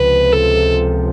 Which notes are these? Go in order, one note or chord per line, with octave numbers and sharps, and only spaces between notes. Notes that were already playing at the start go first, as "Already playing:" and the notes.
Already playing: C#2 C3 F3 B4
A4